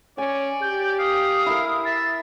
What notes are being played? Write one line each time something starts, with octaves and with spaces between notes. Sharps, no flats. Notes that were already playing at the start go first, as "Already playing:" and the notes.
C#4 D5 G#5
G4 G6
F5 D#6
E4 A#4
E5 A6